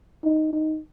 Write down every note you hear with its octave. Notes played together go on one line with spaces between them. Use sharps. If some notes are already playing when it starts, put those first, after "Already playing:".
D#4
D#4